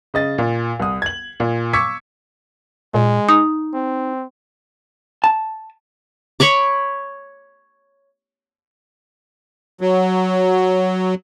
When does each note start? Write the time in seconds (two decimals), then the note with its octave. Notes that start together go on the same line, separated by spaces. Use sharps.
0.14 C#3 D#5 A6
0.38 A#2
0.80 C2 D#6
1.02 G#6 F#7
1.40 A#2
1.73 C#6 D6 E6 G#6 B6 C#7
2.94 A#2 G#3
3.29 D#4 D#6
3.74 C4
5.24 A5
6.40 C#5 B5 C#6 D6
9.81 F#3